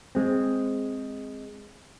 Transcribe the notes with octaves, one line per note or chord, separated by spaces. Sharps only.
G#3 C4